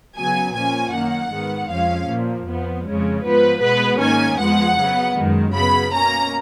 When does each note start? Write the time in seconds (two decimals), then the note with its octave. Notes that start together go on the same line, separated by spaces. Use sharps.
0.17 C#3 F#3 B3 G#5
0.55 A#2 F3 A#3 C#4 G#5
0.93 F#2 D#3 A#3 F#5
1.31 G#2 D#3 G#3 B3
1.70 F2 F3 G#3 C#4 F5
2.09 A#2 F3 A#3
2.47 F2 F3 B3
2.86 F2 C#3 G#3 C#4
3.23 G#2 F3 B3 B4
3.62 B2 G#3 B3 B4
3.99 G#2 D#3 A#3 C#4 G#5
4.38 F2 F3 G#3 B3 F#5
4.77 C#3 F#3 B3
5.15 F#2 D#3 G#3
5.53 C#3 F#3 B3 B5
5.92 B2 A#3 C#4 A#5